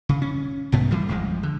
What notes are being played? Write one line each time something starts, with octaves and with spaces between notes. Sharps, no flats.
C#3
C#4
C2 G#2 B3
E3 G3 A3
A1 F2 F3 G#3
D3